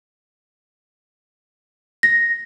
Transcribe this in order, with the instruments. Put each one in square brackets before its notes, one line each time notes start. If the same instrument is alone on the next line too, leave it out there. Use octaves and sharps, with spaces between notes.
[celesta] A#6